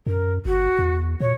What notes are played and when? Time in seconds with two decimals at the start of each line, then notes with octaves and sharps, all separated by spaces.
0.06 F#2 A#4
0.45 G1 F#4
0.79 E2
1.20 A#2 C#5